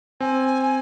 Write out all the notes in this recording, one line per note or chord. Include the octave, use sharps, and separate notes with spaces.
C4 G#5